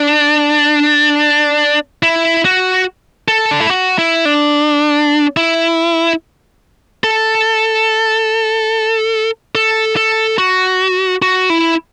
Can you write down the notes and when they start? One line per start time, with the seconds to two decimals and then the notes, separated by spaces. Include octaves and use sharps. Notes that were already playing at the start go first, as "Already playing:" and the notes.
Already playing: D4
2.03 E4
2.45 F#4
3.28 A4
3.51 D4
3.60 E4
3.70 F#4
3.98 E4
4.25 D4
5.37 E4
7.04 A4
9.55 A4
9.96 A4
10.38 F#4
11.22 F#4
11.50 E4